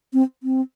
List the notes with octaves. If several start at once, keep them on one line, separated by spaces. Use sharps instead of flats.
C4
C4